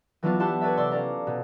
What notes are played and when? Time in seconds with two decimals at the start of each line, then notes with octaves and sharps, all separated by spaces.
0.23 E3 F#3 B3 D4 E4 F4
0.40 E4 G4 F#5 A5 C6
0.61 A4 B4 C#5 D5 E5
0.77 C3 D5 C6 E6
0.91 C#4 A4 D5 F5 A#5
1.27 B2